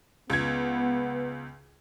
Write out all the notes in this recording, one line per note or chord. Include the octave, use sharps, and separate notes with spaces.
C#2 B3 G#6